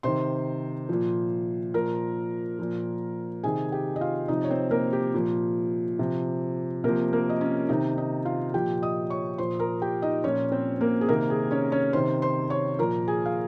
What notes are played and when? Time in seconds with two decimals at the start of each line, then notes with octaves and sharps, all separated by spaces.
0.03 C3 D#3 C5 C6
0.89 A#2 F3
1.74 A#2 F3 A#4 A#5
2.59 A#2 F3
3.43 C3 D#3 G#4 G#5
3.72 G4 G5
3.96 D#5
4.01 F4 F5
4.28 C3 F3 D#4 D#5
4.44 C#5
4.50 C4 C5
4.71 A#3 A#4
4.93 G4
5.14 A#2 F3
5.99 C3 F3
6.84 C3 F3 A#3 A#4
7.13 A#3 A#4
7.29 D#5
7.41 C#4 C#5
7.69 C3 D#3 D#4 D#5
7.98 D#4 D#5
8.25 F4 F5
8.54 A#2 F3 G4 G5
8.82 D#5 D#6
9.10 C#5 C#6
9.38 A#2 F3 C5 C6
9.59 A#4 A#5
9.82 G4 G5
10.02 D#4 D#5
10.24 A#2 F3 C#4 C#5
10.52 C4 C5
10.81 A#3 A#4
11.01 G#4
11.08 C3 D#3 A#3 A#4
11.30 G#4
11.51 C#4 C#5
11.72 C#4 C#5
11.93 C3 D#3 C5 C6
12.22 C5 C6
12.50 C#5 C#6
12.79 A#2 F3 A#4 A#5
13.07 G#4 G#5
13.26 F5